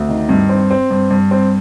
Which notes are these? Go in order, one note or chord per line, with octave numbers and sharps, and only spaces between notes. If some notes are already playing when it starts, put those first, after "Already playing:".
Already playing: D2
D#3
G2
C4
C4
G2
G2
C4